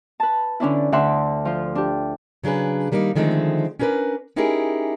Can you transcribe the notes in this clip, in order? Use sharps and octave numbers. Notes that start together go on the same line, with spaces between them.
B4 A5
D3 C#4 D4 E4
D2 D3 D5 E5 F#5 C6
F3 F4
D4 G4
C#3 F#3 D4 G#4 B4
D#3 G3 A#3 C#4 D#4
D3 D#3 F3 G#3 A3 C4
C#4 D4 G4 A#4 B4
C#4 D#4 E4 G4 G#4 A#4